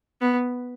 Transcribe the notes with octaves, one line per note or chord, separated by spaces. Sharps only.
B3